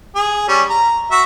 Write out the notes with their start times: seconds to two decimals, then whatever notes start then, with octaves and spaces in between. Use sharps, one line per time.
0.15 G#4
0.48 G3 C#4
0.70 A#5
1.11 F#4 E5